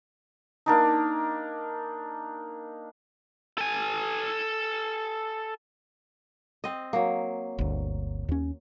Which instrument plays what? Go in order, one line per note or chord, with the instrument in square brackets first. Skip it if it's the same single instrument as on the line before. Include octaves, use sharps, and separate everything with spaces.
[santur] A#3 D4 D#4
[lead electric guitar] A4 G#5
[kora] C4 D#5
F#3 A#3
[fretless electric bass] G1 D2
D#2 C#4